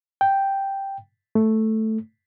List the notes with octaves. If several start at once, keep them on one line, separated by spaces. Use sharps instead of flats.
G5
A3